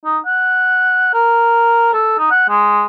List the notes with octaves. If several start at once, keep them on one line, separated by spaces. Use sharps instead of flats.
D#4
F#5
A#4
A4
D#4
F#5
G#3